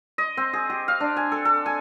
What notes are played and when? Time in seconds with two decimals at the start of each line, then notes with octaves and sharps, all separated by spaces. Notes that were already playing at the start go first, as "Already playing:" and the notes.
0.18 D#5
0.37 C4
0.53 G#4
0.70 G4
0.88 F5
1.00 D4
1.16 G#5
1.32 A4
1.45 A4
1.66 G#5